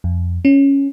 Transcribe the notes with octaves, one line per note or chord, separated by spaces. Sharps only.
F2
C#4